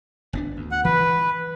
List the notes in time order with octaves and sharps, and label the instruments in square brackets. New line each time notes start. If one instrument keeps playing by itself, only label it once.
[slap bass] G#1 B3 D4
D2
[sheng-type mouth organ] F#5
[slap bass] E3 [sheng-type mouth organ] B4